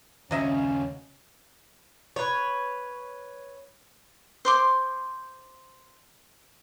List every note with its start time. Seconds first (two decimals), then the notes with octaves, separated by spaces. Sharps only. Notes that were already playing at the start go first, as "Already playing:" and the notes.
0.31 D#2 C#3 F#3 C#4 D#5 E5
2.16 B4 C#5
4.45 C5 C6 D6